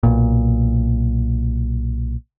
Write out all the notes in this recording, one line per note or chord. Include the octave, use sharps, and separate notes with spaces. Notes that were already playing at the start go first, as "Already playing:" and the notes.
B1 A#2